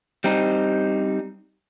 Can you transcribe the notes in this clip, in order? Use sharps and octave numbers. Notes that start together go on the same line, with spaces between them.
G3 C4 D#4